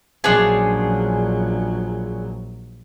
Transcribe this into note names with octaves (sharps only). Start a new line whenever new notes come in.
A#1 F3 F#3 G#3 C#4 D4 G#4